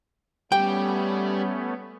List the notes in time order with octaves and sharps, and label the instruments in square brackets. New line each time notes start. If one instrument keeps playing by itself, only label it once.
[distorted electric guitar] G3 [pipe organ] A3 B3 C#4 [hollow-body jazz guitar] G5